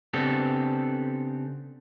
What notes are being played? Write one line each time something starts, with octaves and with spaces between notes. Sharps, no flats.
C#3 B3 C4 D4 G4 A4